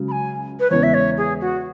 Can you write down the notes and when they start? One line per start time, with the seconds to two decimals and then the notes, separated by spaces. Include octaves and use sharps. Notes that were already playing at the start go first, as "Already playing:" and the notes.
Already playing: C#2 C#3 F#3
0.08 B5
0.12 G#5
0.60 B4
0.70 E2 C#3 G#3 B3 E4 C#5
0.83 E5
0.94 C#5
1.17 G#4
1.41 F#4